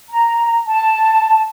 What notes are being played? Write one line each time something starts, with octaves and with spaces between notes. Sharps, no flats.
A#5
A5